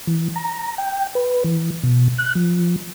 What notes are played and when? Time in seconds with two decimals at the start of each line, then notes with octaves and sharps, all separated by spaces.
0.07 E3
0.36 A#5
0.78 G5
1.15 B4
1.44 E3
1.83 B2
2.18 F#6
2.35 F3